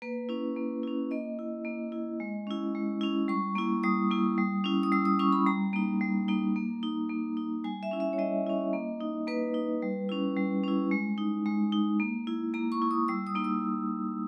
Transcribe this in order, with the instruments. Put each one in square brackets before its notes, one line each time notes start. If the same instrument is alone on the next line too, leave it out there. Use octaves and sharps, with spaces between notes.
[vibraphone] A#3 B4
C#4 E4
A#3
C#4 E4
A#3 D#5
E4
A#3
E4
G#3
C#4 E4
G#3
C#4 E4
G3 C#6
A#3 E4
G3 D#6
A#3 E4
G3
C#4 E4
D#6
G3 E6
D#6
C#4 E4 C#6
B5
G3 A#5
A#3 D#4
G3
A#3 D#4
A#3
D#4
A#3
D#4
G3 G#5
E5
C#4 E4
E5
C#5
G3 D#5
C#4 E4
A#3
D#4
A#3 B4
D#4
G3
C#4 E4
G3
C#4 E4
G#3
D#4
G#3
D#4
A#3
E4
A#3 A#5
C#6
E4
D#6
G3 E6
D#6
A#3 D#4
E6